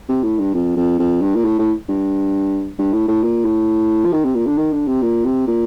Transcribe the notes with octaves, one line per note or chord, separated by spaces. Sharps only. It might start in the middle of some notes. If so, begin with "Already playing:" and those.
C3
A2
G2
F2
F2
F2
G2
A#2
A2
A2
G2
G2
A2
A2
A#2
A2
F3
D#3
C3
A#2
D3
D#3
D3
C3
A#2
C3
A#2